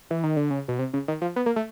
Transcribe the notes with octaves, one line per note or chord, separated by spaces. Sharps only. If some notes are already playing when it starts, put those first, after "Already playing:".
E3
D#3
D3
C#3
B2
C3
C#3
D#3
F3
B3
A#3
A3